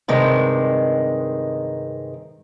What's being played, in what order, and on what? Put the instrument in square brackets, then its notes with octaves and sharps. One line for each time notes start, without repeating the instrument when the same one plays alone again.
[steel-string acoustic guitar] G2 C3 D#3 G#3